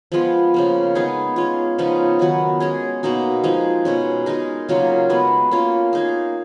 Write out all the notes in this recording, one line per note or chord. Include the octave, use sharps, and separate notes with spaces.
F3 G#3 B3 F4
C#3 F3 A#3
G#3 B3 D#4 G#4
G#3 C#4 F4
C#3 F3 B3 D#4
D#3 F#3 B3 F#4
G#3 C#4 G#4
B2 A#3 D#4 F#4
F3 G#3 D#4
B2 G#3 C#4
G#3 D#4 A#4
C#3 F#3 A#3 F4
G#3 B3 F#4
A#3 C#4 F4
A#3 D#4 G#4